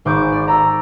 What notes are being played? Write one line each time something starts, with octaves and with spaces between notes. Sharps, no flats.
G#1 C5 C#6 D6 G6
D5
A4 A#5